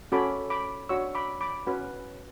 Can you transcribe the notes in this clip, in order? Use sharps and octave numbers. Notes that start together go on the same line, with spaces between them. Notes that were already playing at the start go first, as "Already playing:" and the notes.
C#4 F#4 A4 C#5 B5 D6
B5 D6
D4 F#4 C#5 C#6 E6
B5 D6
B5 D6
C#4 F#4 B4